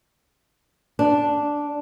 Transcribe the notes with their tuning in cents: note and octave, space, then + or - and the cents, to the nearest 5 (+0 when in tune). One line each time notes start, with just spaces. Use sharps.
D4 -5